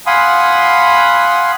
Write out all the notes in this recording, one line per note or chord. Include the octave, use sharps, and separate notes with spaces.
F5 F#5 G#5 B5 C6 D#6